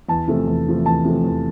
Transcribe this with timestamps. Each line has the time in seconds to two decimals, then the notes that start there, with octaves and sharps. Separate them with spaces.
0.09 E2 A5
0.28 C3 F3 A3
0.47 E2
0.67 C3 F3 A3
0.86 E2 A5
1.04 C3 F3 A3
1.24 E2